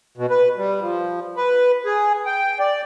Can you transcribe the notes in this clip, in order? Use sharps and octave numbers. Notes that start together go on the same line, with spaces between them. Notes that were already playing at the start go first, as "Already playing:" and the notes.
B2
B4
G3
F3
B4
G#4
G5
D5